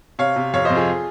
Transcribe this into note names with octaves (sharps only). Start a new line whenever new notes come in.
C3 C#5 F5
C3
F2 C#5 F5
C5 D#5
F2
F4 G#4